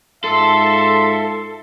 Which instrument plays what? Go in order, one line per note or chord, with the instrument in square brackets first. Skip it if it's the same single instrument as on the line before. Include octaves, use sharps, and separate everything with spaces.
[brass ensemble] G#2 F4 E5 [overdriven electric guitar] A4 [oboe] C6